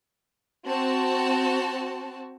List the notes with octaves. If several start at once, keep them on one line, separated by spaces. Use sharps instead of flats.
C4 F#4 A5